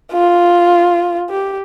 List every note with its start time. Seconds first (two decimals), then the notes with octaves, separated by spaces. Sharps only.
0.13 F4
1.30 G4